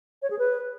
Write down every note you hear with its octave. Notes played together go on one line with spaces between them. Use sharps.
C#5
G#4
B4